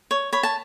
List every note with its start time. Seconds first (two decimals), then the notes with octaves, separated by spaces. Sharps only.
0.11 C#5
0.33 C#5 B5
0.43 A5